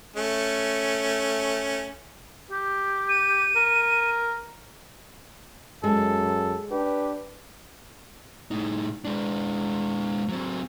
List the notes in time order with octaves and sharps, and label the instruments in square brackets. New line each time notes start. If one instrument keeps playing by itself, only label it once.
[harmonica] A3 C#4
[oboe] G4
[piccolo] D#7
[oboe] A#4
[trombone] F#2 [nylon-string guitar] G#3 [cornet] A4
[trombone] D4 [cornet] G4 [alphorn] B4
[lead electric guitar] A2 D#4
G#3 D4
F#3 C4